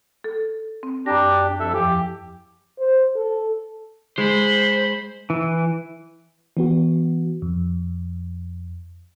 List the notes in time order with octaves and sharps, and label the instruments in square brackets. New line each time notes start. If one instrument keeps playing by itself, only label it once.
[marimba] A4
C4
[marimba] F#2 A#6 [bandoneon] D4 G4
[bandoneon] F2 A4 E5
[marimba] E2 F3 [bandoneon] G4
[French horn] C5
A4
[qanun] G#3 [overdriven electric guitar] C5 [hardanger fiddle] B5
[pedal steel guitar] E3
[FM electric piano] E3 B3 F#4
F2